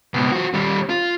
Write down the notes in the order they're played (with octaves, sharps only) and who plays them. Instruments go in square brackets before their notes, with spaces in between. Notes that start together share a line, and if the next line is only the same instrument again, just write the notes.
[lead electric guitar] C#2 B2
F3 F#4
D#2 G3
F4